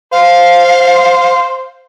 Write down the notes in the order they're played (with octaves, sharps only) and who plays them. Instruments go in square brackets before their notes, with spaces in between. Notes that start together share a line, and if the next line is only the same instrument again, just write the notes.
[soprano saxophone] C5 [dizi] F5